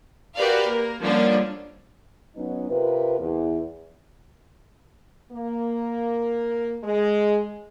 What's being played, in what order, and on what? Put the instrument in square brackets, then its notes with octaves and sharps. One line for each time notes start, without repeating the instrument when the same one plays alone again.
[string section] F#4 G4 A#4 B4 D5 F5
A#3 A#4
D3 F3 G3 A#3 C#4 D4
[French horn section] F#3 B3 C#4 D#4
C3 F4 A#4 B4
E2
A#3
G#3